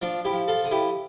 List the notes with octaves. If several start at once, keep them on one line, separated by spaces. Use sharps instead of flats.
F3 D4 F4
E4 G4
F3
F4 A4
D3
E4 G4